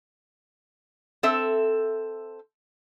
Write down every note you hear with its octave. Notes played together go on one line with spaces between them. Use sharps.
C4 A4 E5